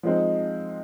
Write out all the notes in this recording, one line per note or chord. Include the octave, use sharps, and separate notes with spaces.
F3 G#3 C4 D#4